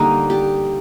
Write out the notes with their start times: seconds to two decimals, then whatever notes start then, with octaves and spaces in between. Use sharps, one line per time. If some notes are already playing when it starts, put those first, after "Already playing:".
Already playing: D3 G3 A#3 D#4
0.30 G4